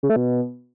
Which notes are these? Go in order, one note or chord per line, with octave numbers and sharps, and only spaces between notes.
C#3
A3
B2